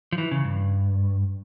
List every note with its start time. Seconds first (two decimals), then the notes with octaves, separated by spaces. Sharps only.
0.12 F3
0.18 E3
0.31 C#3
0.44 G2